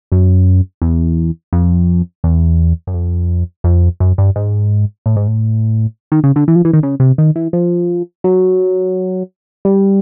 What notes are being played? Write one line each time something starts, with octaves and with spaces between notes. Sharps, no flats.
F#2
E2
F2
E2
F#2
F2
F2
F#2
G2
G#2
A2
G#2
A2
D#3
C#3
D3
E3
F3
E3
D#3
C#3
C3
D#3
E3
F3
F#3
G3